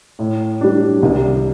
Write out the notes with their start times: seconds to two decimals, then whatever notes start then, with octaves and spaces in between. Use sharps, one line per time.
0.19 A2
0.61 G3 D4
1.02 C2